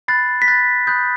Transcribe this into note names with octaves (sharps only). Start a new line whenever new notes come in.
B5 F#6 A6 C7
B6
B5 F#6 A6
B5 D#6 F#6 G6